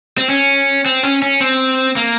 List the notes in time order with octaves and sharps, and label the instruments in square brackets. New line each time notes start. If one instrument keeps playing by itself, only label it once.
[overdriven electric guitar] C4
C#4
C4
C#4
C#4
C4
A#3